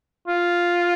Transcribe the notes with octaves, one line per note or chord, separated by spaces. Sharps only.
F4